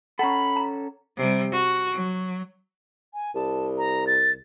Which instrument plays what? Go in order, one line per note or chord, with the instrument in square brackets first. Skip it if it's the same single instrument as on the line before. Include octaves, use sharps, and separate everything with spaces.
[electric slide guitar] C#4 A4 [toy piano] F#5 A#5 C#6 [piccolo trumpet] B5
[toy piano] A#5
[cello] C3 G3
F#4
F#3
[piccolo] G#5
[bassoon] C2 [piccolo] A5
[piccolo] A#5
A6